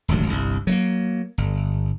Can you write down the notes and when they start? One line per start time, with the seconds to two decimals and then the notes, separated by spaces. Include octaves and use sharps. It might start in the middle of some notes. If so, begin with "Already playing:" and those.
0.08 D#1 G#1 D2 F#3
0.26 G1 C2
0.67 F#3 A3 A#3
1.38 G1